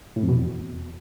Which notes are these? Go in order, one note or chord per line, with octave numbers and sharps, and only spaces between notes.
A2
F2
B2
E2